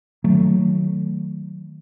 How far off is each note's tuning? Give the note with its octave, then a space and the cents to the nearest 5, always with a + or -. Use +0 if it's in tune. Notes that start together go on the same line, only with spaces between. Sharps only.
D#3 +0 F#3 +0 A3 +10